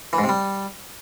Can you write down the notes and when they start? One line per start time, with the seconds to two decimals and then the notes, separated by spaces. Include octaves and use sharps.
0.13 E3
0.18 G#2
0.24 C3
0.29 G3